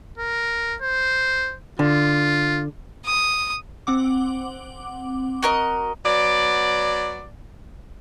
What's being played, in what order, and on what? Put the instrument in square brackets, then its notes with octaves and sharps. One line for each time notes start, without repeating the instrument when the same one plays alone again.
[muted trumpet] A#4
C5
[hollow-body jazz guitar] D3 [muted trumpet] F4
[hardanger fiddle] D#6
[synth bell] C4 F#5 D6
[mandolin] F#4 A#4 D#5
[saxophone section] F#3 B3 D5